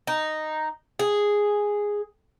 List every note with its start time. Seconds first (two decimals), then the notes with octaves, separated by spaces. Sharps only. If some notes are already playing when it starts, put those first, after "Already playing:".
0.07 D#4
0.99 G#4